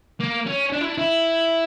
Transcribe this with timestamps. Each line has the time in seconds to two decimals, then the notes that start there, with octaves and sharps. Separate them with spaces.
0.20 A#3
0.46 C#4
0.72 D4
0.81 E4
0.89 D4
0.98 E4